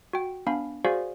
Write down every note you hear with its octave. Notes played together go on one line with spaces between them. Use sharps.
F#4 G5
B3 D4 F5 G#5 B5
F#4 G#4 C5 D5 F5 G#5